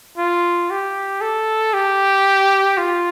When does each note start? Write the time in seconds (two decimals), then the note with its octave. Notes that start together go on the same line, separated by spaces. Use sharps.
0.18 F4
0.70 G4
1.21 A4
1.73 G4
2.78 F4